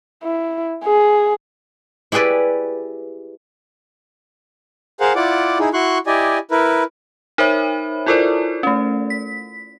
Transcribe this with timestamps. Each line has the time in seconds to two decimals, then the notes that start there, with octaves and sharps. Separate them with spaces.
0.23 E4
0.84 G#4
2.12 E4 G4 G#4 B4 D5
5.00 G#4 A#4 C5 F5 F#5
5.16 E4 F4 D5 F#5 D6
5.59 D#4 E4 G#4
5.73 E4 F#4 C6 C#6 F#6
6.07 E4 G4 D5 D#5 G#5
6.51 E4 A#4 B4
7.38 D#4 A#4 C5 C#5 E5 B5
8.06 E4 F4 A4 A#4 C5 D5
8.63 A3 C#4
9.10 B6